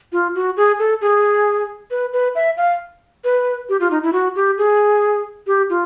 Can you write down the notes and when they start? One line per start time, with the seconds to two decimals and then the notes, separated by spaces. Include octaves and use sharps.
0.12 F4
0.35 F#4
0.57 G#4
0.79 A4
1.01 G#4
1.91 B4
2.13 B4
2.35 E5
2.57 F5
3.24 B4
3.69 G4
3.80 F4
3.91 D#4
4.03 E4
4.13 F#4
4.36 G4
4.58 G#4
5.47 G4
5.70 F4